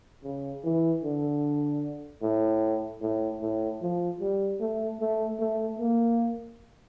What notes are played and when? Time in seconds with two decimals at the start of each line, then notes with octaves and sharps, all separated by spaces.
0.24 C#3
0.64 E3
1.03 D3
2.22 A2
3.01 A2
3.42 A2
3.81 F3
4.21 G3
4.61 A3
5.00 A3
5.40 A3
5.79 A#3